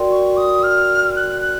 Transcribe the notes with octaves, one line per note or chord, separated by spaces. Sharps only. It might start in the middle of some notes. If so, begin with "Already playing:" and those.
Already playing: F#4 A#4 D5 G5 C6
C#6
D#6
F6
F#6
F#6